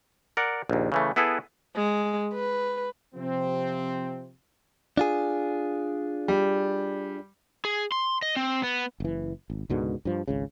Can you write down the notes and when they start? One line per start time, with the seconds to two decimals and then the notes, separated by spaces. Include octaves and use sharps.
0.37 A#4 D5 F#5
0.69 A#1 D#2
0.92 C#3 E3 A3
1.16 B3 E4 G#4 A4 B4
1.76 G#3
2.34 B4
3.15 C3 F3 C4
4.97 D4 F4 G#4
6.28 G3
7.65 G#4
7.92 C6
8.22 D#5
8.36 C4
8.63 B3
9.00 F#1 E3
9.50 G#1
9.70 C#2 G#2 B2 D3
10.05 G2 F3
10.28 G#1 C#2 C#3